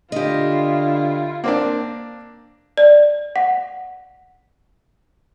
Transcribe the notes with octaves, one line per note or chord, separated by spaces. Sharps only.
D3 E4 F4 G4 D#5
A#3 C4 D4
D5
F#5